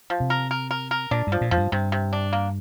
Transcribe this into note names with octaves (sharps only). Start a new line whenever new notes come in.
F3
C3
A#4
A#4
A#4
A#4
A#2 D4
G2
F3
A#2
F2 F3
G2
G2 C3
C3
D4
A#3